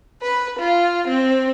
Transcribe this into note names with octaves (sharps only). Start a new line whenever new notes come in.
B4
F4
C4